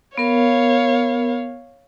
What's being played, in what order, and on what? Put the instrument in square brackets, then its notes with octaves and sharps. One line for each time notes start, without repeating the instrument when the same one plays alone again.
[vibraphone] B3 A#4 [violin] C#5 F5